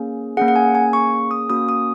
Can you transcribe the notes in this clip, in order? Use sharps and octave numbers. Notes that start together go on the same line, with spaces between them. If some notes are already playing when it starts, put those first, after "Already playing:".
Already playing: A#3 C#4 G#4
A#3 C#4 G#4 F#5
F#5
G#5
G#5
C#6
D#6
A#3 C#4 F#4 D#6
D#6